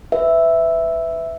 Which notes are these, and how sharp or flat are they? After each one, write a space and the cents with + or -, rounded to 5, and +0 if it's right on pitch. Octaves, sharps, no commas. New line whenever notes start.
B4 +25 E5 +0